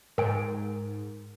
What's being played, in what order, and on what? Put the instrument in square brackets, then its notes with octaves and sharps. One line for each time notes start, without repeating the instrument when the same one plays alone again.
[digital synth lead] G#2 [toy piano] A#4 G#5